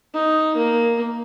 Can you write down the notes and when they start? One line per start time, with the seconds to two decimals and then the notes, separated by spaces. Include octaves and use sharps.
0.14 D#4
0.56 A#3